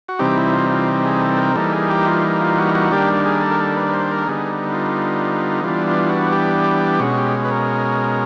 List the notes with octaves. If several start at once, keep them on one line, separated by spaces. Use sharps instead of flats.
F#4
C3 E3 G3 C4 D#4 G4
E4
F4
F4
G#4
A4
A#4
E3 G3 A#3 D#4 A4
G#4
G4
F4
F4
F#4
F#4
D#3 G3 A#3 D4 G4
G#4
A4
A#4
A4
B4
B4
C5
A#4
A4
D3 G3 B3 D#4 G#4
F4
E3 G3 B3 D4 F4
F4
F4
F#4
G4
B2 G#3 C#4 F#4
G4
B4
A#4